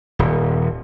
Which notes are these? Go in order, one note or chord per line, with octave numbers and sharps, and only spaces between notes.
D#1